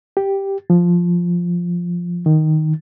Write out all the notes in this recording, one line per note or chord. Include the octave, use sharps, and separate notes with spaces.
G4
F3
D#3